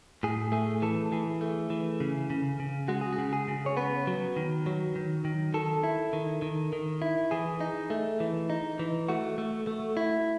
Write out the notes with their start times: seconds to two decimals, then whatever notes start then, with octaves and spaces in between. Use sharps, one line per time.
0.23 A2 G#4
0.52 A3 G#4
0.82 E3 A4
1.12 E3 G#4
1.41 A3
1.70 E3
2.00 C#3
2.30 C#3
2.60 C#3
2.88 G#3 F#4
3.01 G#4
3.13 F#4
3.18 C#3
3.33 G#4
3.48 C#3
3.66 C#5
3.77 B3 B4
4.07 F#3
4.37 D#3
4.66 F#3
4.96 D#3
5.25 D#3
5.54 D#3 A4
5.84 E4
6.13 D#3
6.42 D#3
6.73 D#3
7.02 E4
7.31 E3 G#4
7.61 D#4
7.90 A3
8.20 E3
8.50 D#4
8.79 E3
9.09 A3 F#4
9.38 A3
9.67 A3
9.97 E4